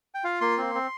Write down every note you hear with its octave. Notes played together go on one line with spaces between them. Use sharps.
G5
F4 F5
A#3 C6
C4
C4